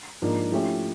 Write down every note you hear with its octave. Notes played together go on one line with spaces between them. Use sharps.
G#2 F3 A#3 D4
F3 A3 C#4 E4 G4